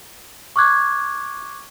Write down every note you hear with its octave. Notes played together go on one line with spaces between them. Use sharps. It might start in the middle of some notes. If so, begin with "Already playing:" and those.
C#6 D6 F6 F#6 G#6